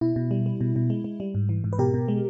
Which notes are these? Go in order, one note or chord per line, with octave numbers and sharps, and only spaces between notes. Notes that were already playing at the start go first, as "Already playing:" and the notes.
B2 E4
B2
G3
G3
B2
B2
G#3
G#3
G3
G#2
E3
G#2
B4
B2 G4 A#4
B2
G#3